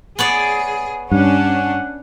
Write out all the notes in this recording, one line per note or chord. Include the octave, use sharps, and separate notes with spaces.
B3 G#4 C#5 D5
G2 C#4 D4 F#5